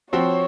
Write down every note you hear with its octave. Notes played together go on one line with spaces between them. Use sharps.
F3 C4 F#4 C5 C#5